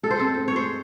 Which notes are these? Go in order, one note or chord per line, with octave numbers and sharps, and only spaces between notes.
G#3 A4
C5
C4 A4
C4
C#5
G#3 C5